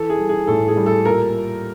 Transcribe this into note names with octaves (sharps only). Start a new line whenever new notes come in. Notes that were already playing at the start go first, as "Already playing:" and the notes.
Already playing: E3 A4
G#4
G3
G#4
A2 A4
G#4
G3
A4
A#2 A#4